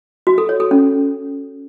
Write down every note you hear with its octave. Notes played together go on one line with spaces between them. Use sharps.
F#4
A4
C#5
A4
C#4